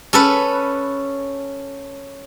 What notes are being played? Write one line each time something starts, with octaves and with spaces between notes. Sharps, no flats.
C#4 A4 B4